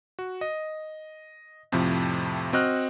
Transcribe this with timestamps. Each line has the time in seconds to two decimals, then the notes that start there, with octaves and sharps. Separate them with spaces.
0.19 F#4
0.41 D#5
1.72 F2 A2 C3 F3
2.53 C4 F#4 D#5 F6 F#6